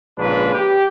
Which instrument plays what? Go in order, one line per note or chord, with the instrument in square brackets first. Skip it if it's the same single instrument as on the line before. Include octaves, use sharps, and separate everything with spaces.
[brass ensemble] A#1 G#2 C#3 D4 B4
G4